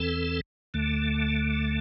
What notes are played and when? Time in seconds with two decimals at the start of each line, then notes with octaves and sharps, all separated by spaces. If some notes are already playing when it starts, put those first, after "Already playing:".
Already playing: E2 E3 C4 A4
0.74 D2 D3 A3